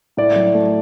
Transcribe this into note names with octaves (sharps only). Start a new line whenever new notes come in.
A2 D5
F#3
A3